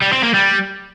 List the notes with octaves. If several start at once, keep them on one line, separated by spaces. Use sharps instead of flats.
G3
C4
A#3
G3